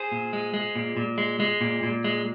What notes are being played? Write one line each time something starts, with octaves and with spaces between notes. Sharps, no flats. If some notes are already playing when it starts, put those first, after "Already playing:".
Already playing: G#4 C5
A#2
G#3
G#3
A#2
A#2
G#3
G#3
A#2
A#2
G#3